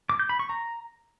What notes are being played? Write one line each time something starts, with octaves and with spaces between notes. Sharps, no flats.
D6
G6
B5
C#6
A#5